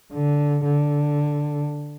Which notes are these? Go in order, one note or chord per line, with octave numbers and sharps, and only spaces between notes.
D3
D3